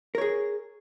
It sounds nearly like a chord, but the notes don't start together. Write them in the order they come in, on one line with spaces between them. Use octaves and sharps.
A#4 C#5 G#4